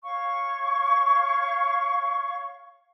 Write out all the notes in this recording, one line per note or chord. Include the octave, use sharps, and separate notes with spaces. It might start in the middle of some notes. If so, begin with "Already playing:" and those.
C#5 F5 C#6